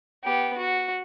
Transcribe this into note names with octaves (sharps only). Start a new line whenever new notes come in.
B3 G4
F#4